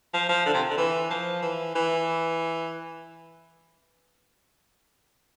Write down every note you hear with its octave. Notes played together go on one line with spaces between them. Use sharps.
F3
F3
D3
C3
D3
E3
F3
E3
E3